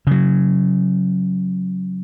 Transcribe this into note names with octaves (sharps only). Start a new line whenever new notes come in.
C#3 F#3